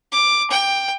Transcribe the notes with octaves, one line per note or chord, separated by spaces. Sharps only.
D6
G5